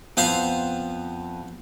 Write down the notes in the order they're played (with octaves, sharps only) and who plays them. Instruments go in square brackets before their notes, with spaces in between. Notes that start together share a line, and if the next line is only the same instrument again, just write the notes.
[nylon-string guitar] F2 [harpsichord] B3 C5 F5